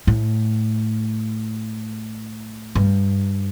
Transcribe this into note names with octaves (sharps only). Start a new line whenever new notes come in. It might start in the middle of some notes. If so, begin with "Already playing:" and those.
A2
G2